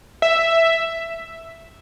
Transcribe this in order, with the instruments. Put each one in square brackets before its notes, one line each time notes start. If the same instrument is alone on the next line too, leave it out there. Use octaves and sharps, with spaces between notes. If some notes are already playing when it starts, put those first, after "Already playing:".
[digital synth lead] E5